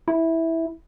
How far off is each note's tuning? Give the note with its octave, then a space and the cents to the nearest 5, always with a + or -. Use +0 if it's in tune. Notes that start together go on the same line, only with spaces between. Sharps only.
E4 -10